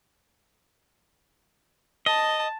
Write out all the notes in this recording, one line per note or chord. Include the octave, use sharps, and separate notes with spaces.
D#5 A5